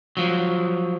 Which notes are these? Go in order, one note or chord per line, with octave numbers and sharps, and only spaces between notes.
F3 F#3